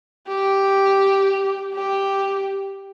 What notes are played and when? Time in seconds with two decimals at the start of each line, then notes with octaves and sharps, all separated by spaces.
0.28 G4
1.75 G4